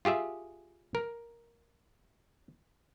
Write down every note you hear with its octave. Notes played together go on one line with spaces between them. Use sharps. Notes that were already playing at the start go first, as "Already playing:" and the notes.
F4 G4 G#4 E5
A#4